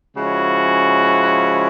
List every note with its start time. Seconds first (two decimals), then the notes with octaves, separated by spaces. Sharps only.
0.17 C#3 F3 G#3 C#4 E4 F#4